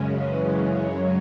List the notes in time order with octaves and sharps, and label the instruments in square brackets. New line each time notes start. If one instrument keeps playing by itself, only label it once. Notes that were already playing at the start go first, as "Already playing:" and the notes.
Already playing: [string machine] F#2 C#3 G#3 C#4
[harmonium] E3
F#3